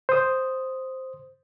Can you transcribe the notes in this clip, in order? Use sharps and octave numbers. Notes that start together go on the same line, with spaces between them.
C5 D#6